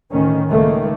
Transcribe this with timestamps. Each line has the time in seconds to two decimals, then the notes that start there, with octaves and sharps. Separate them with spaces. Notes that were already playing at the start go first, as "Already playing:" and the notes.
0.11 D2 A2 D#3 C#4
0.48 C#2 D#3 A3 A#3